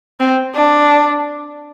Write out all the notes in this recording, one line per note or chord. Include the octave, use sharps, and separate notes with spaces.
C4
D4